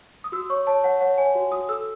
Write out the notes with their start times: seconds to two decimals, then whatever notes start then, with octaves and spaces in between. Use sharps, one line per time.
0.24 D#6
0.32 F#4 E6
0.50 C#5 C#6
0.67 C#5 A5
0.84 C#5 F#5
1.01 C#5 F#5
1.18 C#5 G#5
1.35 F#4
1.52 F#4 D#6
1.69 A4 E6